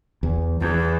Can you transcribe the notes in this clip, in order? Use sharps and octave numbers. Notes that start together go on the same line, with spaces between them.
E2
E2 E3